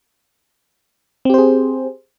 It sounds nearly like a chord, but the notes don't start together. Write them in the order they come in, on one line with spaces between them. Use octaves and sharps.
C4 G4 C5 G#4